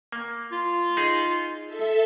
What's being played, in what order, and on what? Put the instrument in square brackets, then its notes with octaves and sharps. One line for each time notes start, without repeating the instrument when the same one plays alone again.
[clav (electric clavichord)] A#3
[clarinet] F4
[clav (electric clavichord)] D#4 G#4
[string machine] A4 E5